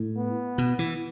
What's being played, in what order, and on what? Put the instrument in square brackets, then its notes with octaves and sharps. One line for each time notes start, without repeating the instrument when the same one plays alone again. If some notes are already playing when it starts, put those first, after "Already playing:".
Already playing: [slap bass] A2
[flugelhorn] B3
[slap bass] B2
E3